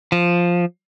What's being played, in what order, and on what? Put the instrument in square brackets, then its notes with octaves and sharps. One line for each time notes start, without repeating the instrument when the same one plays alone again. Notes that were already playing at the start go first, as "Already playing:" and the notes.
[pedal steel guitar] F3